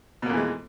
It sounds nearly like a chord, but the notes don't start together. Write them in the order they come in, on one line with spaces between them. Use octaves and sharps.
B2 A#3 F2 E3 G#3